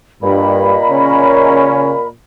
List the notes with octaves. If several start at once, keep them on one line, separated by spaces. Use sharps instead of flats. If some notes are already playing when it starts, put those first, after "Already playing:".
G2 A#2 A#4 D#5 B5
C#3 C#4